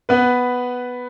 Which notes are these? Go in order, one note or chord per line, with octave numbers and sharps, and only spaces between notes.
B3 B4